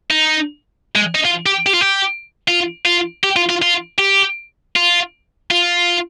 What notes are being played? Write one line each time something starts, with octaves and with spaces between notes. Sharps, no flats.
D#4
G#3
D#4
F4
G4
G4
F4
G4
F4
F4
G4
F4
F4
F4
G4
F4
F4